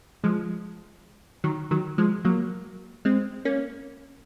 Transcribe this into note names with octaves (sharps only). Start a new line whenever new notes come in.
F3 G#3
D#3 F#3
D#3 F#3
F3 G#3
F#3 A#3
G#3 C4
A#3 C#4